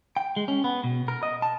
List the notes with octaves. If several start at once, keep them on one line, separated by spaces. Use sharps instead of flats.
G5
G#3
C#4
B3
B2
A#4
D#5
A5